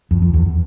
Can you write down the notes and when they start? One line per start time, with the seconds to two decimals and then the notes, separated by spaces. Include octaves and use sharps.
0.11 F2
0.22 F2
0.34 E2